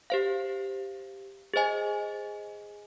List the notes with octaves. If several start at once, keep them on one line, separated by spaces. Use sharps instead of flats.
G4 C5 F5
G#4 C5 D#5 G#5